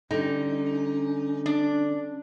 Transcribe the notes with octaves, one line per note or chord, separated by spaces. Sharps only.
D3 G3 C#4 D#4
D4